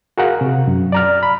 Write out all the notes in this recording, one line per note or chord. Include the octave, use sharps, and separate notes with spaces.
F#4 G#4 A#4 F5 F#5
C3
F#2
D5 A#5 F6
B5